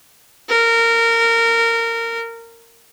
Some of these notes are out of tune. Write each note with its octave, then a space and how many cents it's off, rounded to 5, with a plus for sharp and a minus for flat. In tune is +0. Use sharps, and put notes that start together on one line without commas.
A#4 -20